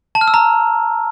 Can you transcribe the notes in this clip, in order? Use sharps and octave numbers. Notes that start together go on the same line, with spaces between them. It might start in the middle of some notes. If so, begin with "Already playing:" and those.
A5
F6
E6
A#5